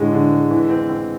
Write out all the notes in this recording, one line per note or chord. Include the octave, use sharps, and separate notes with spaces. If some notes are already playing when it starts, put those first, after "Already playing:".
Already playing: A2 D3 G#3
D3
G#3
E3
C4
C4